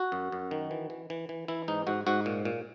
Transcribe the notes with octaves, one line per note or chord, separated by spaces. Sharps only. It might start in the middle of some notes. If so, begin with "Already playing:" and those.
Already playing: F#4
F#2
F#2
D#3
E3
E3
E3
E3
E3 E4
G#2 D#4
G#2 F#4
G#2 F#4
A#2
A#2